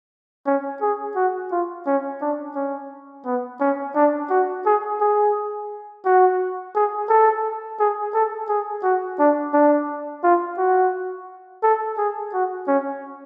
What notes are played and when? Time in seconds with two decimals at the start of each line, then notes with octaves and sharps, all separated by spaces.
0.46 C#4
0.81 G#4
1.16 F#4
1.51 F4
1.87 C#4
2.21 D4
2.56 C#4
3.26 B3
3.60 C#4
3.95 D4
4.30 F#4
4.66 G#4
5.01 G#4
6.05 F#4
6.75 G#4
7.09 A4
7.80 G#4
8.14 A4
8.49 G#4
8.83 F#4
9.19 D4
9.54 D4
10.24 F4
10.58 F#4
11.63 A4
11.98 G#4
12.33 F#4
12.68 C#4